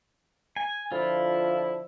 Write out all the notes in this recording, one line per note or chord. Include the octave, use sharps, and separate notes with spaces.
G#5
D3 F3 E4 F4